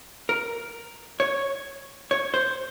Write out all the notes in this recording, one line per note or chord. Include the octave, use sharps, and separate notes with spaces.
A#4
C#5
C#5
C5